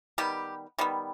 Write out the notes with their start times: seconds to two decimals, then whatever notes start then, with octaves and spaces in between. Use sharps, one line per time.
0.18 D#3 G3 B3 G4
0.79 D#3 G3 B3